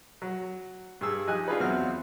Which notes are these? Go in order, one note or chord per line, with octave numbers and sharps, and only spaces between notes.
F#3
G2 G#4 E6
F3 D#4 G4 G#5 F#6
D4 F4 G#4 B4
E2 F#3 C4 F#4 F6